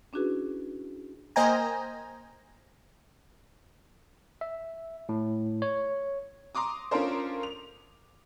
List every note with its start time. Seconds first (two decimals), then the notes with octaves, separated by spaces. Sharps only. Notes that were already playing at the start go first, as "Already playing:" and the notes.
0.13 C#4 D4 E4 F#4 G#4 B4
1.36 A#3 C5 D#5 G5 G#5 A#5
4.41 E5
5.09 A2
5.62 C#5
6.55 A#5 C6 D6 D#6
6.91 C#4 D4 F4 A4 A#4 C5
7.43 F7